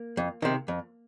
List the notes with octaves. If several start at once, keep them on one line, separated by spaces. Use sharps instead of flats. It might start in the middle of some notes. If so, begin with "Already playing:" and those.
Already playing: A#3
F2
C3 D#3
F2